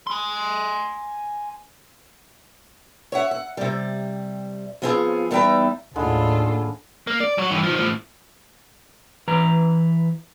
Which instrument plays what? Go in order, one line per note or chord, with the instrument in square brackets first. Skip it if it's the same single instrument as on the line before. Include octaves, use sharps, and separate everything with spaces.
[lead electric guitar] G#5 C6
[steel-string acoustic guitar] C#5 E5 F#5
F#5
C3 G3
F3 B3 C4 F4 G#4
E2 G3 B3 D#4 E5 G5
[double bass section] D#2 A2 [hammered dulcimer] D3 G#3 E4 [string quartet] F4 A4
[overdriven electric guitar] A#3
D5
F#3 C#5
G2 E3
D#3 F3
A2 F3
[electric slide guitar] E3 B4 A#5